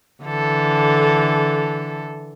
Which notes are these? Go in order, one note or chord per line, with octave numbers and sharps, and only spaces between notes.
D3 E3 A4